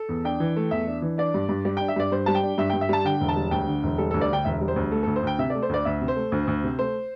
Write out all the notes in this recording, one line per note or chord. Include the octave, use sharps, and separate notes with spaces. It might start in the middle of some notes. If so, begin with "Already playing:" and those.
Already playing: A4
E2
D4 G5
E3
A3
E2 E5
D4
E3
D4 D5
G2
G2
G3 D5
D4 G5
E5
G2 D5
G2 C5
G3 A5
G5
D4
G2 E5
G2 G5
E5
G3 A5
D3 G5
E1
A5
G3
D2 G5
D3
E1
G3 A4
D2 A4
D5
D3 G5
E1 E5
G3
C5
D2
A3 A4
D2 A4
C5
D2 G5
C3 E5
A3 D5
C5
D2 D5
D2 E5
C3
C5
A3
D2
D2
C3
A3 C5